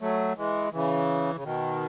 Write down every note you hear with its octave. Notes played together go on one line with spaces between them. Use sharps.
F#3 A3
E3 G#3
C#3 E3
C#3
B2 D#3